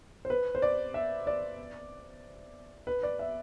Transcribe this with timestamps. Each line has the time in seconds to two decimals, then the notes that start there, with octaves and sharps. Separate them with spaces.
0.25 C5
0.30 B4
0.55 C5
0.62 D5
0.94 E5
1.27 D5
2.87 B4
3.03 D5
3.19 E5